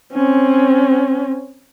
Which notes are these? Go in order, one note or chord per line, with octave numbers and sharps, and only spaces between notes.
C4 C#4